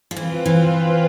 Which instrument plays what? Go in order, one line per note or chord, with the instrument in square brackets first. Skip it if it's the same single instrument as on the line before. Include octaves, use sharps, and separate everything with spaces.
[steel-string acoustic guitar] F3
[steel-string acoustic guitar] E3 [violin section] C4 F4 B4
[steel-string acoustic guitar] E3